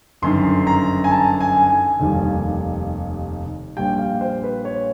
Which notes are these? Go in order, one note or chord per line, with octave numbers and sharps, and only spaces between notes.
G1 F#2 D#3 C6
A#5
G#5
A5
G#5
G#5
F1 D#2 D#3 G3
A#1 A#2 G3 G5
F5
C5
B4
C#5